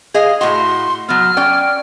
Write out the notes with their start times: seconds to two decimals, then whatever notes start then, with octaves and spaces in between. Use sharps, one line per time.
0.14 G#4 D#5 F5
0.41 A2 F#4 C6
1.09 F#3 B3 F6
1.37 C#4 D5 G5